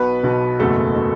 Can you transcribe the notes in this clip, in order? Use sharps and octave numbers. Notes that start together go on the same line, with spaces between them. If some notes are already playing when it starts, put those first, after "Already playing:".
Already playing: B1 B2 B3 B4
B1 B2
F#1 E2 B2 A3 A4
B2